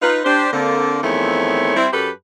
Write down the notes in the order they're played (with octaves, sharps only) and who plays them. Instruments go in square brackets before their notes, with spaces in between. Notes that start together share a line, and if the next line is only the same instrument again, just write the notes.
[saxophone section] D#4 F4 B4
D4 G4 C5
D3 A#3 C4
E2 D#3 F3 A3 C4 C#5
G3 C4 E4
F#2 G4 A4 B4